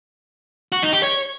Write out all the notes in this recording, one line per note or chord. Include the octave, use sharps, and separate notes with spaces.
F#4
D#4
G4
C#5